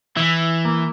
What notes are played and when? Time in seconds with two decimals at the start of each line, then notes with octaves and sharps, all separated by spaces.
0.17 E3 E4
0.65 A#3